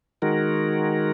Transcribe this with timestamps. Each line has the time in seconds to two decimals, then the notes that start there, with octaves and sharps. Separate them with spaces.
0.22 D#3 G#3 F#4 A#4